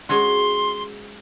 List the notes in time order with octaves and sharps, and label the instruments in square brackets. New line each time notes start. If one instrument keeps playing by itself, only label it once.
[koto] G#3 C#4 F#4 [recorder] C6